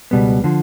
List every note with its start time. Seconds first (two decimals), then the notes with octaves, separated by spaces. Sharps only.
0.11 C#2 B2 G3 B3
0.44 D3 F3